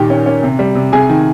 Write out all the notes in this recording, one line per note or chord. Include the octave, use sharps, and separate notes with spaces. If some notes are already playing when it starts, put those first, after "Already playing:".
Already playing: A#2 D#3 G4 G5
C#4
C#4
C3
G3
C3
C3 G#4 G#5
D#3